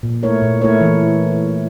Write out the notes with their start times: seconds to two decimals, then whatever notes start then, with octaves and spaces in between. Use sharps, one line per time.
0.03 A#2
0.23 A3 E4 A#4 C#5
0.42 A#2
0.62 A3 E4 A#4 C#5
0.81 E3